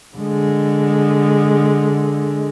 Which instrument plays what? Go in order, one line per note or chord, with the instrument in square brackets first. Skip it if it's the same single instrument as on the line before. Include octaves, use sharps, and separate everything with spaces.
[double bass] D3 G#3